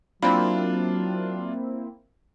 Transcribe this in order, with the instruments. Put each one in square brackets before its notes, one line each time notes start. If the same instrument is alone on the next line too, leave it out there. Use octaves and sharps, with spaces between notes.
[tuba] F#3 [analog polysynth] A#3 C4 E4 [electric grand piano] D4 F4 [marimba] B5